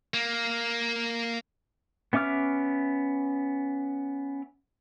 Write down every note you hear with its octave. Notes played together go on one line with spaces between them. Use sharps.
A#3
B3 C#4 E5 D6 F6